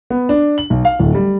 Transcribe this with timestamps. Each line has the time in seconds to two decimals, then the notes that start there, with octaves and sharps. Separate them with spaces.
0.10 B3
0.29 D4
0.58 F#7
0.70 B1
0.85 F5
1.00 D1
1.14 G3